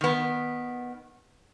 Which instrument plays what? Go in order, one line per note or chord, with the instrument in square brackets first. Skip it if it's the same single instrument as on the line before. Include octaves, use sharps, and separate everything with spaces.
[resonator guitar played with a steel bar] D#3 B3